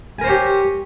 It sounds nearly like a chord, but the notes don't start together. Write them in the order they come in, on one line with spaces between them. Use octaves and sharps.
G#5 A#4 C5 C#5 G4